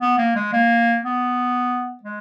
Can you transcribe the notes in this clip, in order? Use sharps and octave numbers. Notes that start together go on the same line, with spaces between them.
B3
A#3
G#3
A#3
B3
G#3